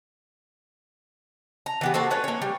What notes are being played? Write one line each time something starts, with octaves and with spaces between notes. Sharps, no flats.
A#5
E3 B3 G4
A#3 F#4 A4 C5
C#4 D4 B4 C#5
A#3 C#5
G3